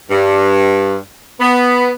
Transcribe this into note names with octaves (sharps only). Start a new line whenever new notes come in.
G2
B3